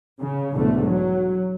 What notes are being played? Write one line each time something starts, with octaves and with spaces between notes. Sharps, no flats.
C#3
B1 E2 G#2 D3 A3
F#3